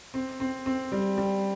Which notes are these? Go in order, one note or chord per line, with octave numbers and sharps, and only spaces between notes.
C4
C4
C4
G3
G3